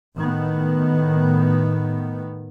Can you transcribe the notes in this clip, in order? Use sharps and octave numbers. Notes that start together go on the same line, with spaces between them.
A2 D#3 B3